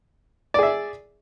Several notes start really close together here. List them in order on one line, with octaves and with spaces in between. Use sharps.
D5 G#4 E5